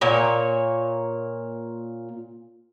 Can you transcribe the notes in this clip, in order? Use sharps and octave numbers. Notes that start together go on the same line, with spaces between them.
A#2 A#3 C#5